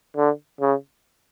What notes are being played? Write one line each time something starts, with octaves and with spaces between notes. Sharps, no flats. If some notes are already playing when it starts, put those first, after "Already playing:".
D3
C#3